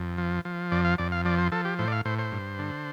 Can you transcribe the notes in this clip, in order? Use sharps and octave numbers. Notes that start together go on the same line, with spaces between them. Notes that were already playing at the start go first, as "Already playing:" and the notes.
Already playing: F2
F3
F3
F2 D5
F5
F2 D5
F5
F3 D5
C5
F3 A4
G4
A2 C5
D5
F5
A2 C5
C5
G2
D3